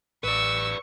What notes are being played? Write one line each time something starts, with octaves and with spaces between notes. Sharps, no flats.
A1 B4 D5 C#6 E6